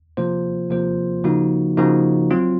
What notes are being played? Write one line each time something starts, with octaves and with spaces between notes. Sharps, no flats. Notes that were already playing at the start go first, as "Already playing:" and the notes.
C3 F3 A#3 F4 C5
C3 F3 A#3 F4 C5
C#3 F3 A#3 D#4 F#4
C#3 F3 A#3 D#4 F#4
F#3 C4 F4